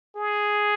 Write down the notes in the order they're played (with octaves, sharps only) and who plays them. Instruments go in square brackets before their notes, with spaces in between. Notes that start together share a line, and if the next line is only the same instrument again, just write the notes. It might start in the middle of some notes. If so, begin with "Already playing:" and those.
[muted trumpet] G#4